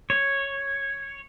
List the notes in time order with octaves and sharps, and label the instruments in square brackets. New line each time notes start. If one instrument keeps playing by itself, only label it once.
[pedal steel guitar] C#5